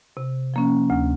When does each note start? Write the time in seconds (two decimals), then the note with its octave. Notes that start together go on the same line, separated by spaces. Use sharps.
0.17 C3
0.54 F3 A#3 C#4
0.90 D2